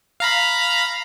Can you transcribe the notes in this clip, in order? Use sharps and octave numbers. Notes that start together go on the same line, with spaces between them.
F5 A#5 B5